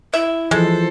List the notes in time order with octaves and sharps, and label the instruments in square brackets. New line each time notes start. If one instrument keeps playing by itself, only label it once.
[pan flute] E4 [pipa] E5
[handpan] E3 F3 [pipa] G#3 [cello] A4 C5